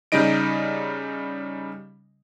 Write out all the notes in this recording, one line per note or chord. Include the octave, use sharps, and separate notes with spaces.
C#3 G3 D#4 D#5 D7